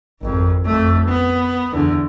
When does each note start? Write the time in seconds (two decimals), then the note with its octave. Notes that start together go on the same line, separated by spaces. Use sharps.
0.21 G#1 F2
0.66 F2 A3
1.08 B3
1.73 E2 D3